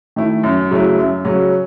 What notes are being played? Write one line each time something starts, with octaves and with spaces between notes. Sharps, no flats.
D#3 A3 E4
F#2
C#3 F#3 A3 E4
F#2
C#3 F#3 C#4